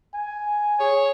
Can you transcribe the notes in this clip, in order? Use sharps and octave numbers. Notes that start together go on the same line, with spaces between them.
G#5
G#4 C#5